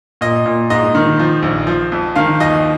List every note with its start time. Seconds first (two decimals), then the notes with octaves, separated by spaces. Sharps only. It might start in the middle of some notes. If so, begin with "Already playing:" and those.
0.21 A#2 D#5
0.46 A#2
0.70 G#2 D#5
0.95 D#3
1.19 F3
1.43 A#1
1.67 F3
1.92 F2
2.16 D#3 F5
2.40 D#2 D#5